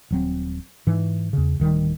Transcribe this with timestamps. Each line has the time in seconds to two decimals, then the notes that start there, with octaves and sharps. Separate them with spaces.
0.11 D#1 F#3 C4
0.87 G#2 E3
1.33 E2 C#3
1.60 D1 D#3 G3